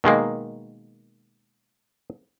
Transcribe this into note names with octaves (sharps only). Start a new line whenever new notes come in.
B2 D#3 G#3 A#3